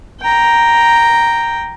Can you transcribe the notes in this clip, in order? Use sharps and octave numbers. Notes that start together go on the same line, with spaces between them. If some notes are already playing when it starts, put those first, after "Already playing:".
G5 A#5